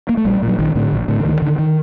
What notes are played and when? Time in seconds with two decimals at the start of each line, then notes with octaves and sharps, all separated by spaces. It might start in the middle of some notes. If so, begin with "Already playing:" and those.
0.09 A#3
0.17 A3
0.25 A#1 G3
0.42 A#2
0.48 F#3
0.59 A#1 D#3
0.75 A2 D3
0.92 A#1
1.08 A2 D3
1.20 D3
1.25 D2 D#3
1.42 D3 D#3
1.59 D#3